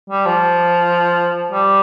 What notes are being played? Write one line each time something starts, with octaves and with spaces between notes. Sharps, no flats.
G3
F3
G3